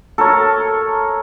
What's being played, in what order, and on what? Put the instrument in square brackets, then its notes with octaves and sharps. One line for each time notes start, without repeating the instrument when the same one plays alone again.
[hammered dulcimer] A4 A#4 C#5